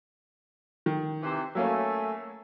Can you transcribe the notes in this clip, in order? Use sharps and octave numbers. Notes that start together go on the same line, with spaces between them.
D#3
C3 E3 C5
F#3 A3 A#3 C#4 E5 G#5